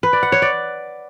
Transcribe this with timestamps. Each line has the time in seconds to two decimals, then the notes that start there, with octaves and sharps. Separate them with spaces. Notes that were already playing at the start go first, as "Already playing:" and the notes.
0.03 B4
0.13 D5
0.23 F#5
0.32 C#5
0.42 D5